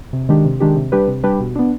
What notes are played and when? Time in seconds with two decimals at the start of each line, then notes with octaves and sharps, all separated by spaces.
0.13 C3
0.29 D#3 G#3 D4 G4
0.45 C3
0.60 D#3 G#3 D4 G4
0.76 C3
0.92 G3 D4 G4 B4
1.08 C3
1.23 G3 D4 G4 B4
1.40 B2
1.55 B3 D4